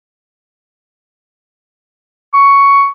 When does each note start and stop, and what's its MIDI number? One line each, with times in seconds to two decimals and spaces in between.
2.34 2.87 85